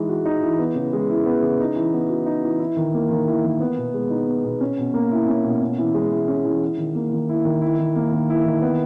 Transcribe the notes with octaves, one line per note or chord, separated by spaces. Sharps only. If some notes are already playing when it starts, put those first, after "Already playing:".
Already playing: E3 G#3 D#4
F#4
D#4
E3
B3
C#3
G#3
E4
B3
C#3
D#4
E3
B3
F#4
D#4
E3
E4
D#3
A#3
D#3
E4
D#3
B3
B2
G#3
D#4
B3
B2
C#4
B2
A#3
E4
C#4
B2
C#4
E3
G#3
E4
C#4
E3
E4
D#3
A#3
D#3
E4
D#3
E4
D#3
A#3
D#3
E4
D#3
B3